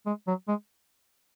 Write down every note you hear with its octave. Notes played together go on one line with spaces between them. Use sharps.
G#3
F#3
G#3